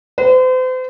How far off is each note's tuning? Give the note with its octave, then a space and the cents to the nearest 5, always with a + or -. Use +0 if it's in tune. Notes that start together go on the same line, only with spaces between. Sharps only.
C5 -40